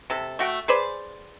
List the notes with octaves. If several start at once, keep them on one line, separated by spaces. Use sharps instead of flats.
C3 A4
A3 F#4 G5
G#4 B4 C5 D5